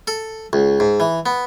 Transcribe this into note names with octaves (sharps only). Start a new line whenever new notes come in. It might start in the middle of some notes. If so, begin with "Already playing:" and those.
A4
C#2
G#2
E3
B3